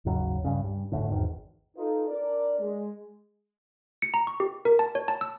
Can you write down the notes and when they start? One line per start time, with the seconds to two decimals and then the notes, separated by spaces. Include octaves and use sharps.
0.05 G#1 D#2 C#3 F#3
0.44 C#2 G2 C#3
0.64 G2
0.92 G#1 D2 A2 D3
1.08 G#1 E2 D#3
1.77 D#4 F4 A4 B4
2.08 D4 A#4 D5
2.59 G#3
4.02 C#7
4.14 A#5
4.27 C#6
4.40 G4
4.65 A#4
4.79 A5
4.95 C#5
5.08 A5
5.21 E6